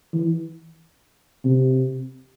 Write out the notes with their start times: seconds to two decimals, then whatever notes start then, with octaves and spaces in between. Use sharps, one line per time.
0.14 E3
1.44 C3